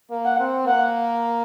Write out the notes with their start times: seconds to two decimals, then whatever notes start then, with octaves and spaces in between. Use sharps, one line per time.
0.10 A#3
0.25 F#5
0.39 C4
0.67 A#3 F#5